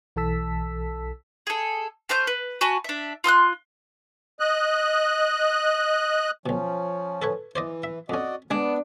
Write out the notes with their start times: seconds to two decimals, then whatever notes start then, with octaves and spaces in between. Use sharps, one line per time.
0.16 B1 E3 A4 A5 E6 B6
1.47 G#4 A4
2.09 A3 C5 F6 G6
2.27 B4
2.61 F#4 G#5 A5 B5
2.84 D4 E5
3.24 F4 C6 E6 F#6
4.40 D#5 F#6
6.46 B1 B2 F3 C#4
7.22 A4 B4 C#5
7.56 E3 C5 D5 D#5
7.84 E5
8.10 F2 C#4 F#4 D5 D#5
8.51 G#3 B3 D4 G#4